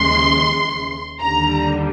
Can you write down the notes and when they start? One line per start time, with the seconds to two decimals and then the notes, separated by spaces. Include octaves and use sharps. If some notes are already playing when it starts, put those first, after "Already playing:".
Already playing: D#2 C#3 E3 G#3 C6
1.21 D#2 D3 G3 A#5